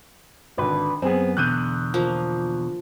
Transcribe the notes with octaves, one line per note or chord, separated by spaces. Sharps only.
G#1 D3 B4
F#2 B3 C4 G#4
E2 B2 D3 F#6 G6 D#7
F3 A#3